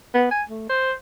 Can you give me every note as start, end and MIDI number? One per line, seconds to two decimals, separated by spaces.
0.14 0.27 59
0.31 0.42 80
0.49 0.68 57
0.69 0.93 72